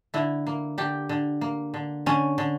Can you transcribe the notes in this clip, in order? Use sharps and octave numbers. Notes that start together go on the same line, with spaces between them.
D3 E4
A#3
D3 G4
D3
A#3
D3
D3 C#4
D3